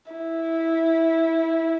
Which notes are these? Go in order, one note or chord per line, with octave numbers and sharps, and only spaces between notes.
E4